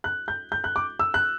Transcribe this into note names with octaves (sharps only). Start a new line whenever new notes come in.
F#6
G6
G6
F#6
D6
E6
F#6